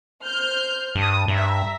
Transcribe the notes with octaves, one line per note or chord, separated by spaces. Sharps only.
C5 F6 G6
G2 A5 D#6
G2 E5 A#5